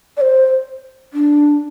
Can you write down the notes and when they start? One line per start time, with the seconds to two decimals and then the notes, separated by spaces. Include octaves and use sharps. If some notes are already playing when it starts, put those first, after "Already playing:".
0.17 D5
0.21 C5
1.13 D4